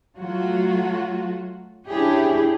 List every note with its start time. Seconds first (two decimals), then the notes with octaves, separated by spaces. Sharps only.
0.16 F#3 A3 F4 F#4
1.88 C#4 D4 E4 G4 G#4